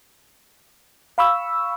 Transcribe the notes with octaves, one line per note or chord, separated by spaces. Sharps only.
F5 B5 C#6 E6